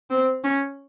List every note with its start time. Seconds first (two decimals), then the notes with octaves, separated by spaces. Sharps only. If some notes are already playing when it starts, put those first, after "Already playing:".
0.10 C4
0.44 C#4